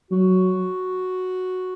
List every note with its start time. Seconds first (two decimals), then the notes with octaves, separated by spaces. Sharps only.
0.10 F#3 F#4